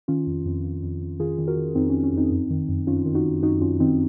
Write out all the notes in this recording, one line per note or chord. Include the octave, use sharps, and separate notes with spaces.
D#3 C#4 F4
F2
F2
F2
F2
F2
D#3 F4 G#4
D#3
F#4 A#4
D#3
F2 C4 D#4
F2 C#4
C#4
F2 C4 D#4
F#2
D#3
F#2
D#3 C#4 F4
D#3
D#4 F#4
D#3
F#2 D#4 F#4
F#2 C#4 F4
D#3 C4 D#4